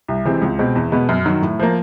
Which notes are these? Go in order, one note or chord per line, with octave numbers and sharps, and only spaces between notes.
C2
C3 E3 G#3 C4
C#2
B2 G#3 C4
E2
B2 G#3 B3
F#2
D#3 F#3
A2
F3 A#3